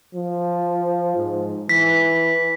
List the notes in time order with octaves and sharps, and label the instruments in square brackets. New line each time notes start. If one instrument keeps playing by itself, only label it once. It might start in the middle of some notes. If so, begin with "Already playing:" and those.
[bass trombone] F3
G#2
[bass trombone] E3 [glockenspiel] B6